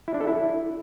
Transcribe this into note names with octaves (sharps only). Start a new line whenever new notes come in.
E4
D4
A4
E4